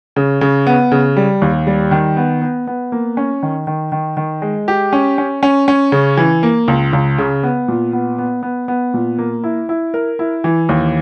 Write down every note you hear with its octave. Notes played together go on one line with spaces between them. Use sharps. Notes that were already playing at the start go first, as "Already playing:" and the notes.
C#3
C#3
B3
C#3
G3
D#2
G3
D#3
B3
B3
B3
A#3
C#4
D#3
D#3
D#3
D#3
G#3
G4
C#4
C#4
C#4
C#4
C#3
E3
A#3
C#2
C#2
C#3
B3
A#2
B3
B3
B3
B3
A#2
A#3
E4
E4
A#4
E4
E3
D#2